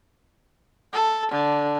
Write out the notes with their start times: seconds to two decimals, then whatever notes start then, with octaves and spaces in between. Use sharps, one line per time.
0.93 A4
1.31 D3